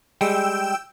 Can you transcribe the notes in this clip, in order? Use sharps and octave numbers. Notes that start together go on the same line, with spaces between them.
G3 G#3 G5 E6